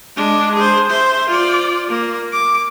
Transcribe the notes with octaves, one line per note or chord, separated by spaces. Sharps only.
G#3 D4
G#4 C5
C5 E5
F4 D5
A#3
D6